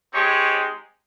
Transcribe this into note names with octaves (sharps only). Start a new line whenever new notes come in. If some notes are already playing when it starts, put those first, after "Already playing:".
G#3 C4 D#4 G4 C#5